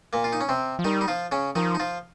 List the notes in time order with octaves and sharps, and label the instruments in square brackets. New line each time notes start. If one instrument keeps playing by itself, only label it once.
[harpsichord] A#2 A#3
F4
D#4
C#4
C3 C4
[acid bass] F3
[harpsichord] D#3 D#4 [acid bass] G3
[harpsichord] D#4
F3 F4
C#3 C#4
[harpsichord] D#3 D#4 [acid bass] F3
[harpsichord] D#4
F3 F4